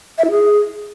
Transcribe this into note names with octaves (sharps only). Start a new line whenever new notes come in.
E5
E4
G#4